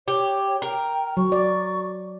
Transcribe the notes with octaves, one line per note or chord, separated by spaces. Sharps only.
G4 C#5
A#4 G5
F#3 C#6
D5